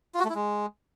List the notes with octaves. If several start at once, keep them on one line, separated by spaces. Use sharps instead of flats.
F4
F#4
A3
E4
G#3